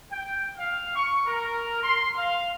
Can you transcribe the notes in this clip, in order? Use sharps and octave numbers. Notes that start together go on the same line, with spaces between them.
G5
F5
C#6
A#4
C6
F5